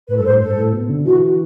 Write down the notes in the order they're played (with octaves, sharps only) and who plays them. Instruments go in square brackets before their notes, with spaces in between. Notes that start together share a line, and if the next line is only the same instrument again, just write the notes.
[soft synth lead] A2 [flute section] B4
[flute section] A4
[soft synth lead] G2
[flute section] C5
[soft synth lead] A2
[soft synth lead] G2 [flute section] A4
[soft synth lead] A2
B2
D3
[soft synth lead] E3 [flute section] F#4